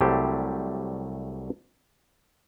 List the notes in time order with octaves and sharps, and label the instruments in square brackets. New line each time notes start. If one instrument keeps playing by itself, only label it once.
[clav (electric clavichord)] C2 F#3 G3 A3 G4 C5